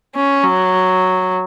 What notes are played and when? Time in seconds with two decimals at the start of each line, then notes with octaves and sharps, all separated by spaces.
0.15 C#4
0.44 F#3